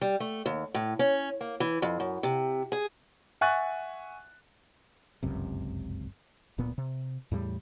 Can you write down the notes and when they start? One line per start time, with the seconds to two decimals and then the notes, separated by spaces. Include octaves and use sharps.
0.01 G3
0.20 A3
0.46 D#2
0.74 A2
0.99 C#4
1.41 A#3
1.60 E3
1.82 F2
2.00 F#2
2.23 C3
2.72 G#4
3.41 E5 F#5 G#5 C#6 F#6 A6
5.23 G1 C#2 F#2 C3
6.58 D1 A#2 B3
6.78 C3
7.32 E2 A2 G3